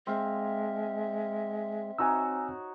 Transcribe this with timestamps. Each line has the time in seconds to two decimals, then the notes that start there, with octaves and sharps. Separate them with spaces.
0.07 G#3 C4 E5 F5
1.98 C4 D#4 F#4 C#5 G#5 A#5 E6